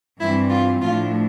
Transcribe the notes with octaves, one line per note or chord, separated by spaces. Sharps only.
G2 E3 G3 C4 E4
F4
A2 F3 A3 D4 F4